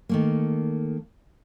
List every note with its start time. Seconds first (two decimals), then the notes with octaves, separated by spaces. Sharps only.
0.09 D#3 A3 A#3